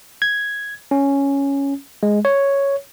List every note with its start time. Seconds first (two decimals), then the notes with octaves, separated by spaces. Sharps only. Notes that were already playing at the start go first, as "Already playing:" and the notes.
0.22 G#6
0.91 C#4
2.03 G#3
2.25 C#5